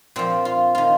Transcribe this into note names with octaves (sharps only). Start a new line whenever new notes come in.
A#2 F3 C4
F4
D#3 F4